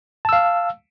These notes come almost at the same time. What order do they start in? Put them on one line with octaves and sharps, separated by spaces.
A5 E6 F5